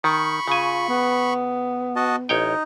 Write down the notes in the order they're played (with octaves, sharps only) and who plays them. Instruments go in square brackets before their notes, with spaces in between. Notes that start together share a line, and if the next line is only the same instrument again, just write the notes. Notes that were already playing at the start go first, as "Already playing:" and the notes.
[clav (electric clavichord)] D#3 [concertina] B5 C#6
[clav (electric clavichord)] C#3 G#5 [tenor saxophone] F4
[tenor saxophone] B3
[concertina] F#4 D#5 A5
[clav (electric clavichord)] A1 C#5 G5 [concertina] D#4